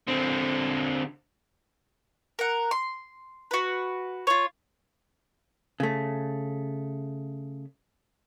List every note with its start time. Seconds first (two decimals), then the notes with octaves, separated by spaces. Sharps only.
0.07 D3 C4
2.39 A#4 F#5
2.71 C6
3.51 F#4 B4
4.27 F4 C#5
5.80 C#3 A3